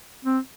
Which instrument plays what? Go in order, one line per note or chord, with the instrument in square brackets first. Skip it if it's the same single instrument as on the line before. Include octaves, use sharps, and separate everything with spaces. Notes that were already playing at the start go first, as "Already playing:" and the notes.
[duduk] C4